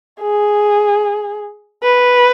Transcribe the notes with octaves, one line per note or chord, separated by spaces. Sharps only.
G#4
B4